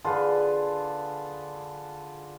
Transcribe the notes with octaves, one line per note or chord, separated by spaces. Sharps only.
D3 F4 G#4 B4